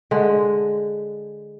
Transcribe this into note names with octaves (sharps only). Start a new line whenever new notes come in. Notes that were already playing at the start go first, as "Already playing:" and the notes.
D3 G#3